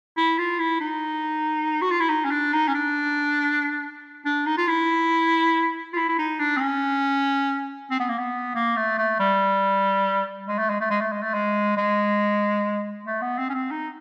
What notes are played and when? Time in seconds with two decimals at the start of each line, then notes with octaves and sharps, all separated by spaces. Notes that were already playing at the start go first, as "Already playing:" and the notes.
0.17 E4
0.38 F4
0.59 E4
0.80 D#4
1.82 F#4
1.91 F4
2.00 E4
2.09 D#4
2.25 C#4
2.31 D4
2.53 D#4
2.68 C#4
2.74 D4
4.25 D4
4.46 D#4
4.57 F4
4.68 E4
5.93 F4
5.96 E4
6.09 E4
6.18 D#4
6.39 D4
6.57 C4
6.61 C#4
7.91 C4
8.00 B3
8.09 A#3
8.18 B3
8.55 A#3
8.77 A3
8.98 A3
9.19 G3
10.48 G#3
10.59 A3
10.70 G#3
10.81 A3
10.90 G#3
11.01 A3
11.12 G#3
11.23 A3
11.34 G#3
11.77 G#3
13.06 A3
13.22 B3
13.38 C4
13.50 C#4
13.54 C4
13.71 D#4